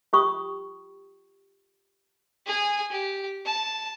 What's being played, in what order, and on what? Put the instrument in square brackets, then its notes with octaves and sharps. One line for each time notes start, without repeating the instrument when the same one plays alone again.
[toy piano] F4 G4 G5 B5 C#6 D#6
[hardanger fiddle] G#4 G#5
G4
A5